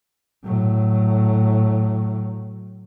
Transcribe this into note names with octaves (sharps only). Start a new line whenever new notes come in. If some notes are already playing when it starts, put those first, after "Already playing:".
A2 F#3